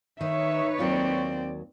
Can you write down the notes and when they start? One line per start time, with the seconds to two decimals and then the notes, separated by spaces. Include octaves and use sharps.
0.21 D#3 D#4 B4 C#5 E5
0.79 D#2 F#3 C4 F4 D5